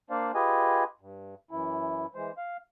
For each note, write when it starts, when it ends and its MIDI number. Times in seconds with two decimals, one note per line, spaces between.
0.10 0.32 58
0.10 0.32 62
0.10 0.32 72
0.10 0.32 74
0.10 0.32 77
0.35 0.84 65
0.35 0.84 67
0.35 0.84 68
0.35 0.84 71
0.35 0.84 75
0.35 0.84 80
1.01 1.35 43
1.51 2.06 42
1.51 2.06 52
1.51 2.06 64
2.15 2.32 52
2.15 2.32 56
2.15 2.32 72
2.38 2.57 77